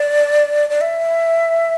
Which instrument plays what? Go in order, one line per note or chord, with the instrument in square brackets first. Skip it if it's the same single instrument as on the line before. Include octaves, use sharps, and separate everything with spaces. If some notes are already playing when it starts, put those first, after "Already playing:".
Already playing: [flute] D5
D5
E5